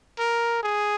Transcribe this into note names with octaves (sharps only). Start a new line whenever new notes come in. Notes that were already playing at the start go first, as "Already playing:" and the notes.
A#4
G#4